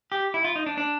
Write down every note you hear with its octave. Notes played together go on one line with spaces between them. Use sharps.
G4
E4
F4
D#4
D4
D4